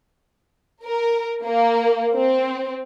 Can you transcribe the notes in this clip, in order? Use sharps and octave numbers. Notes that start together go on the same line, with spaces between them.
A#4
A#3
C4